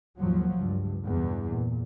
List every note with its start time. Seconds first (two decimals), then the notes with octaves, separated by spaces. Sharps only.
0.18 D#2 G#2 F3 F#3
0.56 C#2 G2
1.06 E2 G2 B2
1.48 A#2